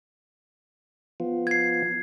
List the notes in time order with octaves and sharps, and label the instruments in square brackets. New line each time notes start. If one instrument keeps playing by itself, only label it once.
[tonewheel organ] F3 B3 F4
[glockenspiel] G#6 C7